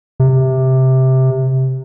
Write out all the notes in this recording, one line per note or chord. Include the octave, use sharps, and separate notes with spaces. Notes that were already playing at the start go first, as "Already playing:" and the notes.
C3